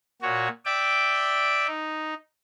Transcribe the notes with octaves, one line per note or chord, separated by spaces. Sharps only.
A#2 F#4 C#5
D5 E5 G5 D6
D#4